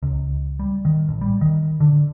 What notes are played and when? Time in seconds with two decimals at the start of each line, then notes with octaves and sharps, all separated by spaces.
0.03 C#2
0.59 G3
0.85 D#3
1.09 A1
1.21 G3
1.41 D#3
1.80 D3